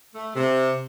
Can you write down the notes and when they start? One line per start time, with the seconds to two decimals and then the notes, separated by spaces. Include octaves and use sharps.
0.14 A3
0.35 C3